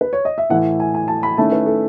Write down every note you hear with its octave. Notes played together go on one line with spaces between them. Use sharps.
B4
C#5
D#5
E5
A2 E3 A3 E4 F#5
G#5
G#5
A5
B5
D#3 A3 C#4 E4 A5
B4
A4